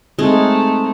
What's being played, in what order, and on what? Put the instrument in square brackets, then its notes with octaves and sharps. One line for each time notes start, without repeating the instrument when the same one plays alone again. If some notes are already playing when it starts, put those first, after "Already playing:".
[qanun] G#3 [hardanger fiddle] A3 [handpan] C4 D#4